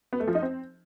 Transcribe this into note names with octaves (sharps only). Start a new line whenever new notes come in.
B3
A3
F3
D#4
C4